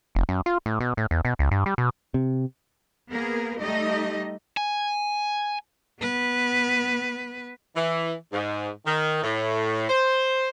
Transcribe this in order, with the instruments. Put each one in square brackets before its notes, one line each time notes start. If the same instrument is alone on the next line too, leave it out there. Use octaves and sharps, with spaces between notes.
[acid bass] F1
F#2
F4
A2
B2
A2
E2
B2
C#2
G2
G3
B2
[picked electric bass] C3
[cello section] A#3 B3 G#4 A#4
G3 A3 D#4 G4 D#5
[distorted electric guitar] G#5
[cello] B3 B4
[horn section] E3
G#2
D#3
A2
C5